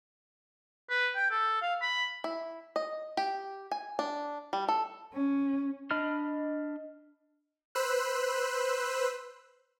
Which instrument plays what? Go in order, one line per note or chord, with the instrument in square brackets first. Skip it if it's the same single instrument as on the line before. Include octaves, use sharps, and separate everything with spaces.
[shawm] B4
G5
A4
F5
B5
[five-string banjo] E4
D#5
G4
G#5
D4
G3
A4
[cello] C#4
[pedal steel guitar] D4 D#5 B5 F6
[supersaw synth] B4 C5 E6 F#6